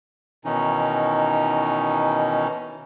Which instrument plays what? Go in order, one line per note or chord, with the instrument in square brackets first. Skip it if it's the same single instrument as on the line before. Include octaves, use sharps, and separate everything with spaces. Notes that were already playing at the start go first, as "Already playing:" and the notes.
[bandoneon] B2 D#3 E3 C#4 D#4